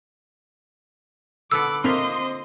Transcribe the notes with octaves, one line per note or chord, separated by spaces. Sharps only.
D3 B3 A4 B5 D6 E6
A#3 C4 F4 D#5 E5 C6